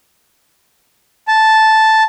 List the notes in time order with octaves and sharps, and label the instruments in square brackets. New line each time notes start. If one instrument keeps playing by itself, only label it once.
[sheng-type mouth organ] A5